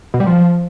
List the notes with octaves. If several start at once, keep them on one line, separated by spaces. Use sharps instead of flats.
B2
G3
F3